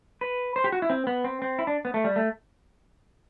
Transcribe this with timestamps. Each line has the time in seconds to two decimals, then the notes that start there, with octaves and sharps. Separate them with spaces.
0.21 B4
0.56 C5
0.64 G4
0.72 F#4
0.82 E4
0.90 C4
1.07 B3
1.24 C4
1.42 C4
1.59 E4
1.67 D4
1.85 B3
1.94 A3
2.04 G3
2.16 A3